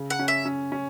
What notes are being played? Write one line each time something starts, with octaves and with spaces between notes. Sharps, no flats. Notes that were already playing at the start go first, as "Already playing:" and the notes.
Already playing: C#3
F#5
C#4
E5
C#4
C#4